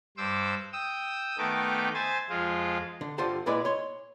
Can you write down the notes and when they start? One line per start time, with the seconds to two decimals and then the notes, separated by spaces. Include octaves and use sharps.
0.17 G2 C5 D6 E6
0.73 G5 D#6 E6
1.38 D#3 A3 B3 D#4 G5 D6
1.94 C5 E5 G#5 A6
2.29 F2 G#3 F4
3.01 D3
3.18 G2 D3 F4 C5 F#5 A5
3.46 A#2 G#3 E4 B4 D5
3.65 C#5 C6